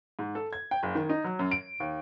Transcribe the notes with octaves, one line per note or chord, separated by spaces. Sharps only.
G#2
A4
G#6
G5
F#1
D#3
D#4
F#3
F#2
D7
D#2